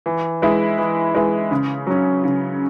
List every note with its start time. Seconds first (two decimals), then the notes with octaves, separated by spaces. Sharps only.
0.06 E3
0.42 G#3 E4 B4
0.78 E3
1.15 G#3 E4 B4
1.51 C#3
1.87 F#3 C#4
2.24 C#3